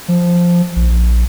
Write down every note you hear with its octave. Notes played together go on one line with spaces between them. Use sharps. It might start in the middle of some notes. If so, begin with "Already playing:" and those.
F3
A#1